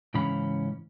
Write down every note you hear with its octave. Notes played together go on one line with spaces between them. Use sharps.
G#2 C#3 E3 C#4 B5